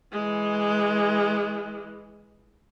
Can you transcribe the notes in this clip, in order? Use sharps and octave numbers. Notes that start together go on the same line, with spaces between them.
E3 G#3